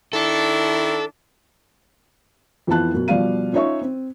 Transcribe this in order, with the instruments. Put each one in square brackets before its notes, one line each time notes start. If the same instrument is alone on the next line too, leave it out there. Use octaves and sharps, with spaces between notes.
[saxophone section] D#3 D4 E4 [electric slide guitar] A4
[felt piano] F2 E3 B3 F4 A5 F#6
F#2 B2
B2 F3 G3 D5 F5 D#7
C#4 D#4 F4 C#5 E5 C#6
C4